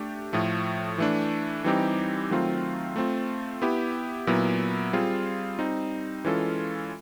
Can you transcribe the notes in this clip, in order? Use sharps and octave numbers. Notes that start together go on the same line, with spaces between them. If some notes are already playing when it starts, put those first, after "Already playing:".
Already playing: A3 D4 G4
A2 F3 A3
E3 A3 D4
E3 G3 C4 D#4 G4
D#3 F#3 A3 C4 F4
A3 C4 F4
B3 E4 G4
A#2 F#3 B3 E4
G3 C4 F4 G#4
G3 C4 D#4
E3 G#3 C#4 F4 A4